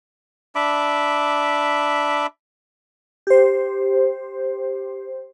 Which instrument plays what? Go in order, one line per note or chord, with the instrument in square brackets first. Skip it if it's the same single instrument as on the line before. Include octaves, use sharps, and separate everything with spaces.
[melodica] D4 E5 B5 D6
[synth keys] G4 C5